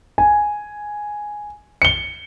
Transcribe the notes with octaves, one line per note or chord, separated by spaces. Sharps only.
G#5
C#7 G7